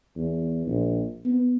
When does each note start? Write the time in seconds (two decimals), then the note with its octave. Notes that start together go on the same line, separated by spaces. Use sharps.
0.16 E2
0.67 A#1
1.25 B3